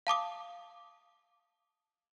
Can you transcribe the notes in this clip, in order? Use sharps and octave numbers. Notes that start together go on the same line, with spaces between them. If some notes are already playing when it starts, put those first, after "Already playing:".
F5 A5 D6 D#6